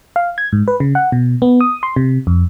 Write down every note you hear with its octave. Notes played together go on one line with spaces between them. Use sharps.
F5
G#6
G#2
B4
C#3
F#5
B2
B3
D#6
C6
C3
F2